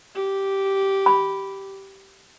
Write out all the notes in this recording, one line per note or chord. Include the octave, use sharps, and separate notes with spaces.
G4
B5